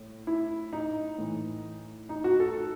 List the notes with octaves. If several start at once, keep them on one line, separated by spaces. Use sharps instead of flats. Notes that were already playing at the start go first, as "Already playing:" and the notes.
Already playing: A2
E4
D#4
A2 E3
D#4
F#4
A4